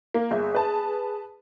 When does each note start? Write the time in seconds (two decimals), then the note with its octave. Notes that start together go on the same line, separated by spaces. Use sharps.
0.14 A#3
0.31 G1 G#4 E5
0.55 B4 A5